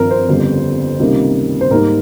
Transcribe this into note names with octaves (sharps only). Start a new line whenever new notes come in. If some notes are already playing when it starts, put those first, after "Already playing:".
Already playing: G#1 G2 F3 C4 A#4
C5
G1 F2 C#3 G3
C#2 C3 D#3 G3 A#3
C5
G#2 G3 A#3 D#4 A#4